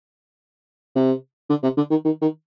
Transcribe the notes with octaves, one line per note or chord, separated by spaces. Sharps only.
C3
D3
C3
D3
D#3
D#3
D#3